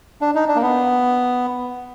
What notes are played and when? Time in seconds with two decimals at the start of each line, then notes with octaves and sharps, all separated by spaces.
0.21 D4
0.35 D#4
0.48 D4
0.56 A#3
0.62 B3